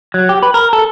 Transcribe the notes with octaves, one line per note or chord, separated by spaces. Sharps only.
F#3
G4
B4
A#4
A4